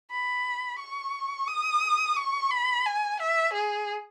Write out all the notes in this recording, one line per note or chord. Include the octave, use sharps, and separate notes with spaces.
B5
C#6
D#6
C#6
B5
G#5
E5
G#4